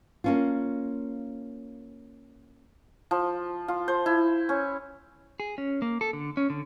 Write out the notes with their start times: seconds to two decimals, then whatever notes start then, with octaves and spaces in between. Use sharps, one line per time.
0.24 A#3 C#4 F4
3.11 F3
3.68 F4
3.88 C5
4.06 E4
4.49 C#4
5.40 G#4
5.58 C#4
5.82 A#3
6.01 A4
6.13 D3
6.37 C#4
6.50 D3